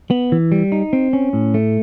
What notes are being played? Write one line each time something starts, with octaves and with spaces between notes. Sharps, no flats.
B3
E3
G3
D#4
C4
C#4
A2
A3